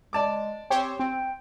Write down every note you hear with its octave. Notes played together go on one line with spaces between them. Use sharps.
G#3 D5 A5 D6
C4 G4 C5 C#5
C4 G5